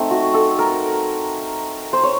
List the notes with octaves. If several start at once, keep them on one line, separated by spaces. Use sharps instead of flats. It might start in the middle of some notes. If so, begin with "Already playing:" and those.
Already playing: A3 C4 D#4
F#4
A4
A#4
C5
C#5